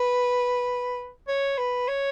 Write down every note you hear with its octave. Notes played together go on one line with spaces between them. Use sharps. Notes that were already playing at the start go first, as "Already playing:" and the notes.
Already playing: B4
C#5
B4
C#5